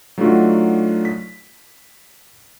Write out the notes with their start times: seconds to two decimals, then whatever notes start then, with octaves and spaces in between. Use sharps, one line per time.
0.18 F#3 A3 D4 D#4 F4 F#4
1.05 B6